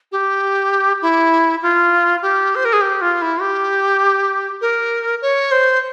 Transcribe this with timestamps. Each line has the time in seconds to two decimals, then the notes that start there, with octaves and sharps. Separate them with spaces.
0.12 G4
1.02 E4
1.62 F4
2.22 G4
2.55 C5
2.65 A#4
2.73 G#4
2.81 G4
3.01 F4
3.22 E4
3.41 G4
4.61 A#4
5.22 C#5
5.51 C5